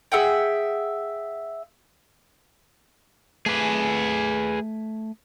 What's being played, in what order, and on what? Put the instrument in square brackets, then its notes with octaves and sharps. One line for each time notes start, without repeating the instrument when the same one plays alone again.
[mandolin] G#4 E5 F#5 G5
[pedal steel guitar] A3 G#5 D6 [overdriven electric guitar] G#4 B4